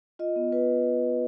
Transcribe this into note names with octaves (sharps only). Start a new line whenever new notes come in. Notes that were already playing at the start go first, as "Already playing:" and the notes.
F4 D#5
B3
F4 B4